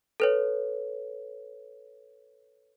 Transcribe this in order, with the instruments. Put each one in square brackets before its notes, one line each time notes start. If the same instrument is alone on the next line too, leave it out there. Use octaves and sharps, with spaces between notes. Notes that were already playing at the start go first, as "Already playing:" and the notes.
[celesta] A4 B4 C#5